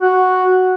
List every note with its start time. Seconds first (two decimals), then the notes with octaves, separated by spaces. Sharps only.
0.01 F#4